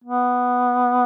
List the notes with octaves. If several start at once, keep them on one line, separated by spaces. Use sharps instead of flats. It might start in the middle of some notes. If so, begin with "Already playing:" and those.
B3